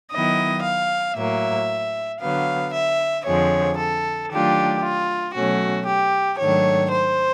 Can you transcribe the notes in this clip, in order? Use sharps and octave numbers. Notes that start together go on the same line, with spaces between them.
D#3 F#3 B3 E4 D#5
F5
A2 F#3 A#3 E5
D3 F#3 B3 F5
E5
F2 D3 F3 G#3 C#5
A4
D#3 F#3 A3 D4 F4 G4
F4
B2 F#3 A3 C#4 F#4
G4
G#2 D#3 F#3 A3 D4 C#5
C5